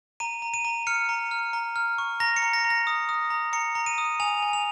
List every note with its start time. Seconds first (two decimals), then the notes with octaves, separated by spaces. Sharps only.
0.20 A#5 D#7
0.42 A#5
0.54 D#7
0.65 A#5
0.87 F6 C#7
1.09 A#5
1.31 F6
1.53 A#5
1.76 F6
1.98 C#6
2.20 A#5 A#6
2.36 C#7
2.42 A#5
2.54 A#6
2.64 A#5
2.70 A#6
2.87 D#6
3.09 D#6
3.30 A#5
3.53 A#5 C#7
3.75 A#5
3.86 D#7
3.98 D#6
4.20 G#5 F7
4.42 G#5
4.53 F7